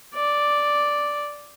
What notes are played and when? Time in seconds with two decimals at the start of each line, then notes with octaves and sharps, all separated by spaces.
0.14 D5